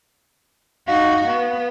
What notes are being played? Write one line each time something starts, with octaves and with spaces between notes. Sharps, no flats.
D#4 F#4 F5
B3